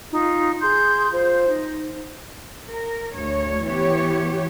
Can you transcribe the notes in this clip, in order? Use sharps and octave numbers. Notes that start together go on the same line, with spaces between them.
D#4 F4
G#4 C6 G6
F4 C5
D#4
A#4
D2 C#5
E3 B3 G4 C#5